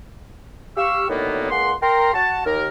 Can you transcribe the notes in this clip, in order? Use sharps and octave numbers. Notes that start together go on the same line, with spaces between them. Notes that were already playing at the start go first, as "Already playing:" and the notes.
G4 F5 C#6 E6
A2 D3 D#3 F#3 A#3 B3
C#2 A#3 G#4 F#5 C6
A#4 G5 A#5 C6
F#4 A5
D#2 A#4